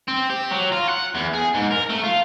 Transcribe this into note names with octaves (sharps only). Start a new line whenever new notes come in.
C4
G4
F#3
F4
F#5
E2
G#4
G#2
A#4
A3
F4